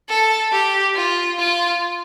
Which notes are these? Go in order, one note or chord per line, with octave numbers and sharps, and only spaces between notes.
A4
G4
F4
F4